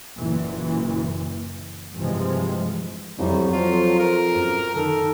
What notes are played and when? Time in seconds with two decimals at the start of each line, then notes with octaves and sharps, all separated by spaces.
0.17 F#1 A#2 E3
1.96 G2 C3 E3 F3 G#3
3.18 C2 F2 F#3 G3
3.53 F2 F3 F4
4.00 A#4
4.30 F#2
4.74 D#3 A4 A#4